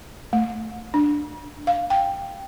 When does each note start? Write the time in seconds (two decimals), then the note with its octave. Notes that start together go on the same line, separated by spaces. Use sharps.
0.33 A3
0.94 D4
1.67 F5
1.90 G5